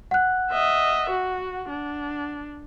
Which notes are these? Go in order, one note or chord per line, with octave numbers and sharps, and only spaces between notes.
F#5 F#6
D#5 E5
F#4
D4